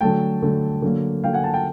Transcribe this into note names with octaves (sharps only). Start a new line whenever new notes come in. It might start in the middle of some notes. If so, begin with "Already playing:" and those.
D3 F#3 A3 G5 A5
D3 F#3 A3
D3 F#3 A#3
D3 F#3 A#3 F5 G5
F#5 G#5
G5 A5
G5 A5